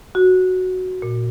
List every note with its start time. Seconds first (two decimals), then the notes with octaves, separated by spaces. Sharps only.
0.15 F#4
1.02 A#2